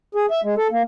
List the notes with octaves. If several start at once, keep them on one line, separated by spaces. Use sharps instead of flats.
G#4
E5
G#3
A4
A#3